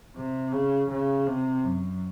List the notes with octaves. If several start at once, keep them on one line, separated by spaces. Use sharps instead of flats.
C3
C#3
C#3
C3
F#2